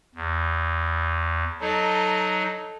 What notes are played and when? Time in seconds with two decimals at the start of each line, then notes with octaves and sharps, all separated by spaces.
0.15 E2
1.61 F#3 D#4 A4 D#5